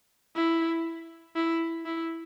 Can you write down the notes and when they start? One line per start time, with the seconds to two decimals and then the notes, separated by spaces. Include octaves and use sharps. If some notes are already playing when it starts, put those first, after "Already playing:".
0.35 E4
1.36 E4
1.85 E4